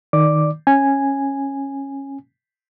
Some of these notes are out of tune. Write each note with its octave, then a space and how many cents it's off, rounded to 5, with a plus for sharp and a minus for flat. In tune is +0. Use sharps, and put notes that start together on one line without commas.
D#3 +0 D5 +0 D6 +0
C#4 -15 G#5 -5